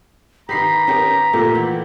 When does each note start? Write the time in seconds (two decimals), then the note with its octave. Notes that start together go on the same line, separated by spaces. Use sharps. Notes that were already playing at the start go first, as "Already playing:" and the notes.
0.49 D#3 B3 G4 A#5 B5 B6 C7
0.87 B3 C#4 G4 A#4
1.33 A#2 A3 A#3 G4
1.55 E3 F#5